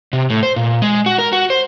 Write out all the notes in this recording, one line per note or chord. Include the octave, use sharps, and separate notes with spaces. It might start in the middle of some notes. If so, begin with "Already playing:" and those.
C3
A2
C5
A#2
G#3
F#4
A#4
F#4
C5